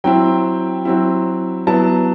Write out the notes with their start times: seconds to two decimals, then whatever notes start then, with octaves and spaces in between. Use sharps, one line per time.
0.04 F#3 C4 E4 G5
0.85 F#3 C4 E4
1.67 F#3 B3 E4 A5